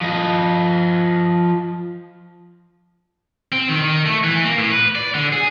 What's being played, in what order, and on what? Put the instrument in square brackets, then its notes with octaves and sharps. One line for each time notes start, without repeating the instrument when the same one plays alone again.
[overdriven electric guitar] F3 D#5
[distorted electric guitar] C4
D#3
D#3
A3
E3
A#3
A2
B4
D5
D3
G#4